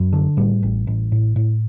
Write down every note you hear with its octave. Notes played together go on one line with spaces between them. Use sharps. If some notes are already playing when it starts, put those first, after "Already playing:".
Already playing: F#2
D3
A2 G3
A1
A1
A2
A2